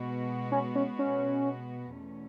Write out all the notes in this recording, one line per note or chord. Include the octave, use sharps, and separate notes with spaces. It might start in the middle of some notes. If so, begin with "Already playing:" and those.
Already playing: B2 G#3 B3 F#4
C#4
C#4
C#4
E2 B2 A3 C#4